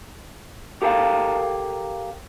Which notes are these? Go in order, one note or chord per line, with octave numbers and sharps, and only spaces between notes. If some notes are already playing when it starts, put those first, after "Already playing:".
G4 A4 A#4 F5 G5 A#5